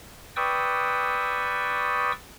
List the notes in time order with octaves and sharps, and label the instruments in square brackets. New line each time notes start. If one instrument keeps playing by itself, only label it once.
[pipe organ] B4 D5 G5 C#6 D#6 E6